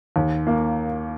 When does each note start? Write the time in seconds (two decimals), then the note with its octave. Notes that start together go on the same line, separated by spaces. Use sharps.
0.16 D#2
0.47 A#3